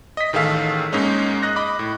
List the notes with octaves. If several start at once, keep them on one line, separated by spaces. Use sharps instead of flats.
D#5 B6
A1 D#3 G#4 A4 F5 E6
G#2 G#3 A#3 C#4 D#4
D#5 F#6 A#6
D#5 B5 D6
A2